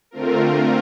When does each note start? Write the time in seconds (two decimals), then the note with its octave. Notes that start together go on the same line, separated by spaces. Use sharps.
0.11 D3 A3 C4 F4 A#4